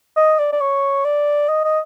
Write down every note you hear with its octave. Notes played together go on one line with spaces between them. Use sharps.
D#5
D5
D5
C#5
D5
D#5
D#5